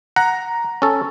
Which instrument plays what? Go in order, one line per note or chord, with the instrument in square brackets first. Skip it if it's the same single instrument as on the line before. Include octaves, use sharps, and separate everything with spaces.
[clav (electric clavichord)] F#5 [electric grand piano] A#5
[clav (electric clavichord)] C#4 A4